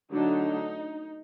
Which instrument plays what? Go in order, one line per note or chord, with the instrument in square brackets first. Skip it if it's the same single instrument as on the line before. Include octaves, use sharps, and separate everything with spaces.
[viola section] D3 F#3 A3 D4 D#4